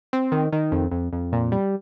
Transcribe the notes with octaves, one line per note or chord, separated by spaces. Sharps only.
C4
D#3
D#3
F2
F2
F2
A#2
G3